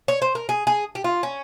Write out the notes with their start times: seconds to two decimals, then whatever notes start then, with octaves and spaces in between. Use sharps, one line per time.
0.08 C#5
0.22 C5
0.35 A#4
0.49 G#4
0.67 G#4
0.95 G4
1.04 F4
1.23 C#4